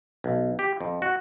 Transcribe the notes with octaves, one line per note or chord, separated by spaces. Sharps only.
B1
G4
F2
F#4